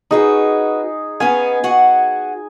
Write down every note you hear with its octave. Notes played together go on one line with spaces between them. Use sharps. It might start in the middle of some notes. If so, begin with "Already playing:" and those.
C#4 D#4 F#4 G#4 B4
B3 C#4 F5 G#5
F#4 G#4 F#5